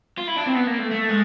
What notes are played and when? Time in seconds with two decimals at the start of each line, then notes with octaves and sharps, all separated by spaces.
0.18 F4
0.28 E4
0.37 D4
0.46 C4
0.54 B3
0.67 A#3
0.79 A3
0.91 A3
1.09 G#3